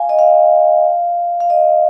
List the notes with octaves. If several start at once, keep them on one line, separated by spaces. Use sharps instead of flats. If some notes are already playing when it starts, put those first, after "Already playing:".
Already playing: F5 G#5
D#5
F5
F5
D#5